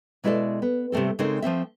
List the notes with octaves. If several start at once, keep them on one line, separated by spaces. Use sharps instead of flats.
B2 G#3 E4 G#4 A4 D5
B3
C3 G3 A3 C4 A4
C#3 G#3 C4 D#4 A4 A#4
F3 A3 C4 E5